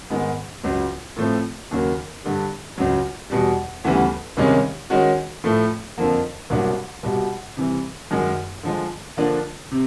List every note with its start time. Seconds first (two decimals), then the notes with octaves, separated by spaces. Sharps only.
0.10 G#2 D#3 G#3 B3
0.63 C#2 C#3 F#3
1.16 A2 F3 A3 C4
1.71 D#2 C#3 F#3 A#3
2.24 G2 D3 G3
2.78 C#2 C#3 F#3
3.30 E2 B2 G3
3.84 D2 C#3 E3 G3 B3
4.37 C2 C3 D#3 G#3 C#4
4.90 D#3 G#3 C#4 F#4
5.44 A2 F3 A3
5.98 F2 D3 F3 A#3
6.50 C2 B2 F#3 A#3 D4
7.03 C2 B2 G3
7.57 C3 E3 G3
8.11 F#2 D#3 G#3
8.63 D3 F3 G#3
9.17 D3 F3 A#3 D4 F4
9.72 C3